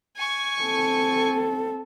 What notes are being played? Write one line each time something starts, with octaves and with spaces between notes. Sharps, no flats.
G#5 C#6
C4 A4